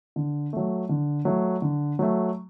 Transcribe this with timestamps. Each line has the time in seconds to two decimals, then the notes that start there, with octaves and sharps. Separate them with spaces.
0.16 D3
0.53 F#3 A3
0.89 D3
1.25 F#3 A3
1.62 D3
1.99 F#3 A3